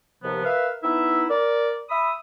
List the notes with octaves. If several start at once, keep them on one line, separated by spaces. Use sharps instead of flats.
D#2 C3 F3 B3
A#4 B4 E5 F5
B3 D#4 E4 E5
A#4 D5
E5 B5 D#6